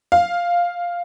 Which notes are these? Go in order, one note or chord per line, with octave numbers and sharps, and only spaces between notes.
F5